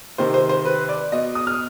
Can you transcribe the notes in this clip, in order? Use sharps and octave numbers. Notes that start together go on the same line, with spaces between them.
C3 D#3 C5
C5
C5
B4
D5
B2 D#5
D#6
F6